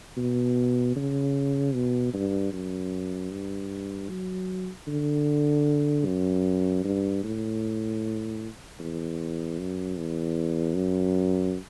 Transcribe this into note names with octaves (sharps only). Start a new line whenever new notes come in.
B2
C#3
B2
G2
F#2
G2
F#3
D3
F#2
G2
A2
E2
F#2
E2
F#2